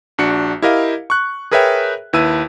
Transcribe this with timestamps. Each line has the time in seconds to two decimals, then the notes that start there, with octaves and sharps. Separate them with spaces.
0.18 A#1 D4 F#4 C#7
0.62 E4 G4 A#4 D#5 F5
1.10 C#6 F#6
1.51 G#4 A#4 B4 C#5 E5 G5
2.13 D#2 E4 B4 A5 E6 D#7